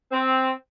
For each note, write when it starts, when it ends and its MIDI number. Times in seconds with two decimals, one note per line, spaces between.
0.12 0.50 60